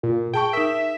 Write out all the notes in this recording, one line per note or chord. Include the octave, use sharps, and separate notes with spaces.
A#2
G#4 G5 A5 C#6
D#4 A#4 E5